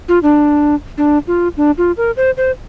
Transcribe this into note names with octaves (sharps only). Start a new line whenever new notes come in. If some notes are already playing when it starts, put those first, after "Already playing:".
F4
D4
D4
F4
D4
F4
A#4
C5
C5